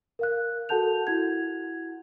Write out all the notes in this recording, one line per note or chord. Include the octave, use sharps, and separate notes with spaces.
A#4 F5 F#6
F#4 A4 F#5 A5 G6 F7
E4 F#4 F#5 G#6